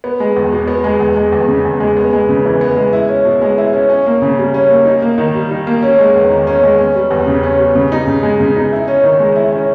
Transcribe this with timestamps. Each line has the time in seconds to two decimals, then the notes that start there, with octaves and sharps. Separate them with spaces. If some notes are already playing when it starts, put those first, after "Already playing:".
0.04 B3
0.20 G#3
0.36 E2
0.52 B2
0.68 B3
0.84 G#3
1.00 E2
1.16 G#3
1.32 E2
1.48 C#3
1.65 E2
1.80 G#3
1.97 B3
2.13 G#3
2.29 C#3
2.46 E3
2.61 B3
2.77 G#3
2.93 E4
3.09 C#4
3.25 B2
3.42 G#3
3.58 E4
3.73 C#4
3.90 C#4
4.06 A#3
4.22 C#3
4.38 G3
4.54 C#4
4.70 A#3
4.85 D#4
5.02 A#3
5.18 D#3
5.34 G3
5.51 D#4
5.67 A#3
5.83 C#4
5.98 G#3
6.15 E2
6.30 D#3
6.47 C#4
6.63 G#3
6.78 C#4
6.95 G3
7.10 E2
7.27 C#3
7.43 C#4
7.59 G3
7.75 C#3
7.92 D#4
8.07 C#3
8.23 G#3
8.40 C#3
8.56 D#4
8.72 E4
8.88 C#4
9.04 D#3
9.19 G#3
9.36 E4
9.53 C#4